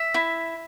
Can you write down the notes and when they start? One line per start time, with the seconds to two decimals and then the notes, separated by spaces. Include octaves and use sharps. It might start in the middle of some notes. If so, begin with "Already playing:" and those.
Already playing: E5
0.14 E4